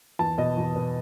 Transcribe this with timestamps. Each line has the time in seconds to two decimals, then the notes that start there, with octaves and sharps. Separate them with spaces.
0.19 E2 A5
0.38 B2 D#5
0.57 E2
0.76 B2